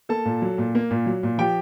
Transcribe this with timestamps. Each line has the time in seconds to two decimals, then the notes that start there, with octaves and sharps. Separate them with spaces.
0.09 A#3 A4 A5
0.25 A#2
0.42 F#3
0.58 A#2
0.75 A#3
0.91 A#2
1.06 F#3
1.23 A#2
1.38 F3 G4 G5